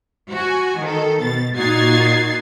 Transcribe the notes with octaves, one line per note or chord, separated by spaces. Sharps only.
F#4 G#5
D#3 A4
B2 A6
A#2 D#4 F#4 G#6 A6 C7